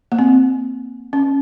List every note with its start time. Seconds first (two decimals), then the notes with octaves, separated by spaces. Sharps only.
0.12 A#3
0.19 C4
1.13 C#4